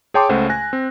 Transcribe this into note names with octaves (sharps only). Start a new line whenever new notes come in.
G#4 C#5 G5 A5 C6 D6
C#2 C#3 A3 C5 F#5
G#5 F#6 A#6
C4